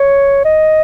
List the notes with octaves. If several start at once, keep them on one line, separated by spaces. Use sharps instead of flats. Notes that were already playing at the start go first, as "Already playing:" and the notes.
Already playing: C#5
D#5